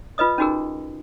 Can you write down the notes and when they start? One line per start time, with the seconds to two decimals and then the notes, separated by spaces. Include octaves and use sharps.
0.18 F4 B4 D#5 D#6
0.38 C#4 D#4 F#4 G#4 A#4